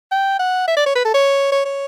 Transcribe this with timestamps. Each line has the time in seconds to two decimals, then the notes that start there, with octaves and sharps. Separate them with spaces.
0.11 G5
0.39 F#5
0.68 E5
0.77 D5
0.86 C#5
0.96 B4
1.05 A4
1.14 C#5
1.52 C#5
1.65 C#5